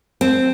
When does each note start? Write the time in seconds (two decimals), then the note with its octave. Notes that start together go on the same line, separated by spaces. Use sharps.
0.21 C4